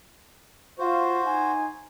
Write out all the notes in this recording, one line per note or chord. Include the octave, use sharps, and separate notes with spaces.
F4 F#4 C5
D#4 G#5